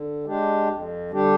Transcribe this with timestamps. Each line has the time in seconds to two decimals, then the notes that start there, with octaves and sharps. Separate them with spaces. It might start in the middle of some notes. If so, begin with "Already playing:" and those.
Already playing: D3
0.25 G#3 D4 G4
0.68 F2
1.10 D3 G3 D4 G4